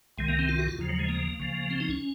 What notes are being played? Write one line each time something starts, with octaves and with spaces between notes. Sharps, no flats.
C2 C3 D#3 G#3
A#3
C4
F4
F#4
F4
D#2 C#3 F3
F#3
G#3
A#3
C#2 C#3 F3
C4
D#4
C#4